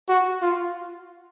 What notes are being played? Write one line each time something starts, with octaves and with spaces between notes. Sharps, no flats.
F#4
F4